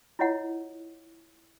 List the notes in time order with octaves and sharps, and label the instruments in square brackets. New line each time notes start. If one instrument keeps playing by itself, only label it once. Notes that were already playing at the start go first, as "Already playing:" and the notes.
[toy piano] E4 F4 C#5 D#5 F#5